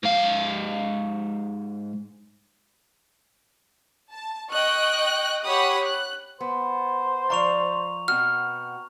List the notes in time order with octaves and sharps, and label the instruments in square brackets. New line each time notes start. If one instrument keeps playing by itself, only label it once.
[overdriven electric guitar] G#2 F5
[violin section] A5
D#5 G5 C#6 F#6
G4 C#5 F#5 B5 D#6
F#6
[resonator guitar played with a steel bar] B3 [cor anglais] C5
[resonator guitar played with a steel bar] F3 D5 F5 [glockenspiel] A#5 C#6 F7
[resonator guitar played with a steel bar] B2 C4 F#4 [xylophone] F6